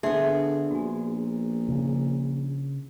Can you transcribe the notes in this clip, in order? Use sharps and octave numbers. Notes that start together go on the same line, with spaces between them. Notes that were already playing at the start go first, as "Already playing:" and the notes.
D3 B3 G#4 E5 A5 C6
A#1 F#4 G4 G#5
C#3